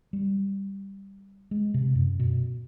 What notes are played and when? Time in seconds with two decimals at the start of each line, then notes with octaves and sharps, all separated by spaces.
0.13 G3
1.51 G#3
1.74 C3
1.95 F#2
2.20 B2